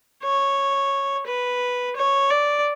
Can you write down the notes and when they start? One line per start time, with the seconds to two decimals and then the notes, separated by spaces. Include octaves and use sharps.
0.23 C#5
1.27 B4
1.96 C#5
2.30 D5